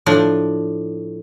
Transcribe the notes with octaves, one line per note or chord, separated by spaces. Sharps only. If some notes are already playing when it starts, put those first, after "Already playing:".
A2 F3 D4